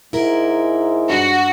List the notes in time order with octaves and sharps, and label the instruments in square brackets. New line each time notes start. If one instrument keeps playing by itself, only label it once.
[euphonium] G#2 [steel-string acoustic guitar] E4 A#4
[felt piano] G2 [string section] F#4